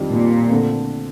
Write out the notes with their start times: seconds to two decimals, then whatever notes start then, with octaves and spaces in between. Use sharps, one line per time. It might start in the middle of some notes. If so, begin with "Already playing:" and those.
Already playing: F2 D#3 G3 D4
0.10 A#2
0.50 D3 A3 C4